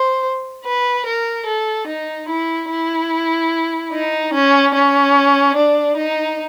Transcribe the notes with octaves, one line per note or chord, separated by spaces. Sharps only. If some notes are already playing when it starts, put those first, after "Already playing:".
Already playing: C5
B4
A#4
A4
D#4
E4
E4
D#4
C#4
C#4
D4
D#4